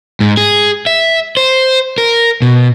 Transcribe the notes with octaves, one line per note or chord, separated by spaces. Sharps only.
G#2
G#4
E5
C5
A#4
B2